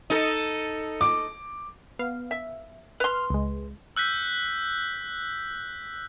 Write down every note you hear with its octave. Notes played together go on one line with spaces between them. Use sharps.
D#4 A4
D6
B3 F5
E5
B4 C6 F6
C#2 G#3
E6 F#6 G6 B6